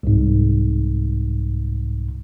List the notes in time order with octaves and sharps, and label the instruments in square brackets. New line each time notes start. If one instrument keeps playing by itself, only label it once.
[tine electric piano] C2 G#2